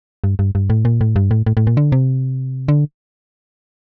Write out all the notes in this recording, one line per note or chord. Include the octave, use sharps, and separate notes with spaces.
G2
G2
G2
A2
A#2
A2
G2
A2
A2
A2
A#2
D3
C3
D3